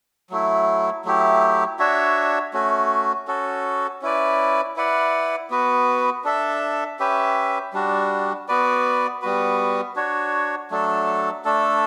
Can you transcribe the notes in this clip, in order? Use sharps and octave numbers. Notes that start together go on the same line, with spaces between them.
F#3 A3 E4
F#3 A3 E4 G4
D4 F#4 C#5 E5
A3 C#4 F#4
C#4 F#4 A4
C#4 E4 B4 D5
E4 B4 D5 F#5
B3 F#4 B4
D4 A4 E5
C#4 G4 B4 E5
G3 D4 F#4
B3 F#4 B4 D5
G3 B3 F#4 B4
D4 F#4 C#5
F#3 A3 D4 A4
A3 D4 A4